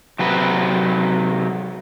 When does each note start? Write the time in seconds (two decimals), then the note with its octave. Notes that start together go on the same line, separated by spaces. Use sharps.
0.19 C3 F#3 B4